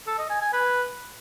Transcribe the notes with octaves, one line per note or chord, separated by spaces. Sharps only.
A4
D#5
G#5
G#5
B4